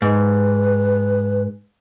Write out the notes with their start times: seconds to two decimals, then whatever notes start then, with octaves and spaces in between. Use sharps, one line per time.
0.02 G#2 B4